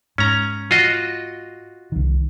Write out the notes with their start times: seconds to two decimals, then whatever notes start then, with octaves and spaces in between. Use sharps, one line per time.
0.18 G#2 C#4 A#5
0.71 F4 F#4 D#5
1.92 C2 D#3